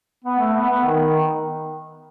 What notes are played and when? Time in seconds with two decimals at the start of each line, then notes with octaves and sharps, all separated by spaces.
0.24 B3
0.38 A3
0.54 B3
0.69 B3
0.84 D#3